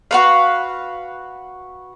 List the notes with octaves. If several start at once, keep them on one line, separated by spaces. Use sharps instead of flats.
F#4 B4 F5